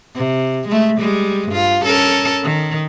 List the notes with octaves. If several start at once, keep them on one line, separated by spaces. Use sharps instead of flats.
C3
G#3 A3
G3 G#3
G2 F4
C#4 A4 A#4
D#3